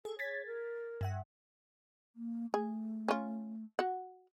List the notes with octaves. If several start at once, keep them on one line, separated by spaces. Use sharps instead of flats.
G#4 A4
C#5 G#6 A6 B6
A#4
G2 E5 F#5
A#3
A3 G#4
C#4 F4
F#4 F#5